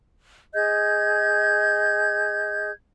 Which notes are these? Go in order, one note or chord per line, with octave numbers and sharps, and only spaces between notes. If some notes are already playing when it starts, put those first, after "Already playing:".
G#4 D#5 G6 G#6